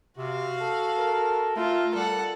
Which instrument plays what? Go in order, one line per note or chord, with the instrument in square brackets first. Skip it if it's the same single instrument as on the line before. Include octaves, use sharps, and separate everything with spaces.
[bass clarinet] C3 [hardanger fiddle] F#4 F5
[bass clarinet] A4
[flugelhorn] A#4
[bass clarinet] A3 [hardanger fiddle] F4
[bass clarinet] G3 [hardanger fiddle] A4 F#5